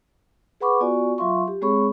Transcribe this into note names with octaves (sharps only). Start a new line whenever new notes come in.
G#4 B4 F#5 B5 C#6 D6
B3 F4 F#4 D5 G#5 C#6
F#3 F4 E5 F5 C6 C#6
G4
G#3 C4 G#4 C#5 B5 C#6